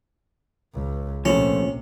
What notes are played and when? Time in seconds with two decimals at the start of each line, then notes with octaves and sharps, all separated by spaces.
0.74 C#2
1.25 A#1 C3 F3 A3 C#4 C5